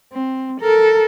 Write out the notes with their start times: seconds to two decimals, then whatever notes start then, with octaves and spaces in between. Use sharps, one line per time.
0.13 C4
0.61 A4 A#4